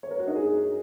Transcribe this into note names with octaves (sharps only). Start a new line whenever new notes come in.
C#5
A#4
F#4
D#4
G#4